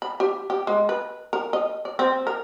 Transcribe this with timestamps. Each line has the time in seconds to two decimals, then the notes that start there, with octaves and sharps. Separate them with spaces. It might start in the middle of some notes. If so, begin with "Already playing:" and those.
0.02 B5
0.20 G4
0.50 G4
0.67 G#3
0.89 B4
1.33 A#4
1.53 D#5
1.85 D5
1.99 C4
2.27 A#4